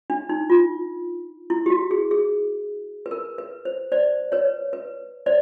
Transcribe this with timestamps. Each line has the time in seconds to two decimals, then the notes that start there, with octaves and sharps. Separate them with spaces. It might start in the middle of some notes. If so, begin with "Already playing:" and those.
0.10 D4
0.29 D#4
0.50 F4
1.50 E4
1.66 G4
1.70 F#4
1.91 G#4
2.11 G#4
3.06 B4
3.11 A#4
3.38 B4
3.65 C5
3.92 C5 D5
4.32 B4 C#5
4.73 B4
5.26 C5 D5